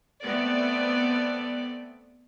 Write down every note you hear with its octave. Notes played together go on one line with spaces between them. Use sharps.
A3 B3 C4 D5